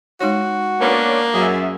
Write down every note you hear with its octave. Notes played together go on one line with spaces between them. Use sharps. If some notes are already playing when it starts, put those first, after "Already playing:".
G#3 D#4 F#4 C#5
A#3 B3 C#4 D4
F#2 F#3 G#4 C#5 E5